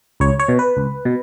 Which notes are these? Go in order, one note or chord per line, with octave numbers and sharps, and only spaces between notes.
C#2 C#5
C#5
B2
B4
C#2
B2